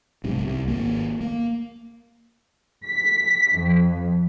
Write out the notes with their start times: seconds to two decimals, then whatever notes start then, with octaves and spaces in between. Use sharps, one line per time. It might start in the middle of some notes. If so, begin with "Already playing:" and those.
0.24 B1 G#2 C3
0.45 C2
0.68 G#1 A#3
1.21 A#3
2.87 B6
3.54 F2